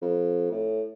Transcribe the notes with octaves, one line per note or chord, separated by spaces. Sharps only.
F2
A2